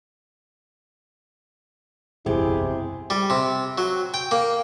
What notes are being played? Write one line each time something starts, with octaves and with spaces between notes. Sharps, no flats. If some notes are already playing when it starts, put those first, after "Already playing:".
F#1 B1 E2 C3 G#3 E4 G4 G#4
G3
C3
F#3
G5
A#3